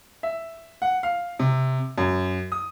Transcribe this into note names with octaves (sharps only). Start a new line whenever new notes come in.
E5
F#5
F5
C3
F#2
D#6